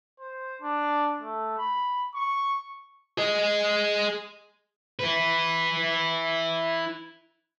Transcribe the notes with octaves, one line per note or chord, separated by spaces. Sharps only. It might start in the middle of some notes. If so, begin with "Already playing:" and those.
C5
D4
A3
B5
C#6
G#4 D#5
E4 B4